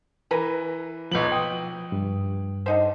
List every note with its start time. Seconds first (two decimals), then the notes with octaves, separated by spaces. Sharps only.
0.31 E3 A#4 B4
1.11 B1 F3 B3 F#7
1.32 G5 D#6
1.92 G2
2.66 D3 D#4 C5